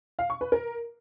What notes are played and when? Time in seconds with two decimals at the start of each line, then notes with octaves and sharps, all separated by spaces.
0.19 F5
0.30 C#6
0.41 B4
0.52 A#4